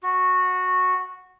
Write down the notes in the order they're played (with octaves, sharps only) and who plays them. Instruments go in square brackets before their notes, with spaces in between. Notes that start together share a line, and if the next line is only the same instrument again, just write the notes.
[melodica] F#4